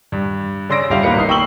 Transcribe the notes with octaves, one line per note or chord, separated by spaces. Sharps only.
G2
C#3 D5 C6 E6 A#6 D7
G1 G3 F4 G4 E5 F5
G#1 A#3 D#4 B4 C#7
B1 D#4 C7
G5 C#6 E6 F#7 G7